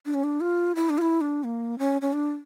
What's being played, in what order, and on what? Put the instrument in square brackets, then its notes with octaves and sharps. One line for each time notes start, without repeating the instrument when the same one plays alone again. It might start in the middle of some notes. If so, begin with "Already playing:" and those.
[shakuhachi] D4
C#4
D4
F4
E4
D4
F4
E4
D4
A#3
C#4
C#4
D4